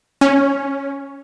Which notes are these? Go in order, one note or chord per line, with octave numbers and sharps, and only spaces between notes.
C#4